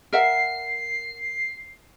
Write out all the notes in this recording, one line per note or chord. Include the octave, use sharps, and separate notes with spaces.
A#4 E5 F#5 C7